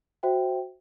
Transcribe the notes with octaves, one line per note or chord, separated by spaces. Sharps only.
F#4 C5 E5 G5